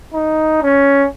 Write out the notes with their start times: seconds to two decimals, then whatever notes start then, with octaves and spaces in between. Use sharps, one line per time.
0.14 D#4
0.62 C#4